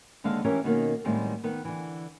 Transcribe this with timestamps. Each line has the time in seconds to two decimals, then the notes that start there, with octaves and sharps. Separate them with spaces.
0.24 D#2 D3 G#3 A4 F5
0.44 E3 C#4 G4 A#4 C#5
0.64 B2 D#3 A#3 C#4
1.05 A2 D#3 G3 G#3 B3 C4
1.44 D#3 B3 B4
1.65 D3 E3